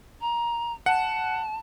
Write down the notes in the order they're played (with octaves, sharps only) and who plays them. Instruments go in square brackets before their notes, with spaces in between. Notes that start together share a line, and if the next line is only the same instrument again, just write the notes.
[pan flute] A#5
[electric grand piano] F#5 [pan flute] A5